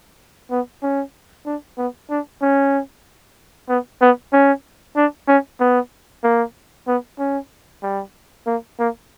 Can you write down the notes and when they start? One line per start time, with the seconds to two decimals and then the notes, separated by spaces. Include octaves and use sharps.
0.51 B3
0.83 C#4
1.46 D4
1.78 B3
2.10 D4
2.42 C#4
3.69 B3
4.01 B3
4.33 C#4
4.96 D4
5.28 C#4
5.60 B3
6.24 A#3
6.87 B3
7.19 C#4
7.83 G3
8.47 A#3
8.79 A#3